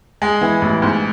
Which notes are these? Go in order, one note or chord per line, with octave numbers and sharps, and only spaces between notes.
G#3
E3
A1
G#2